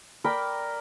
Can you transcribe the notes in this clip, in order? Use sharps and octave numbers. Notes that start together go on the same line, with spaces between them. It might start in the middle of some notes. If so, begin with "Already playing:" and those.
A#4 D5 G5 B5